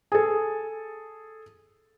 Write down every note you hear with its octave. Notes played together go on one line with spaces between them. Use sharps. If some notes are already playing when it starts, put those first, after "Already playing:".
G#4 A4